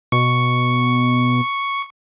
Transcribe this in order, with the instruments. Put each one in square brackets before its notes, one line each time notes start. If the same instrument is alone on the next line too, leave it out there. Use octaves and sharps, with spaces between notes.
[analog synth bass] B2 [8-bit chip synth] C#6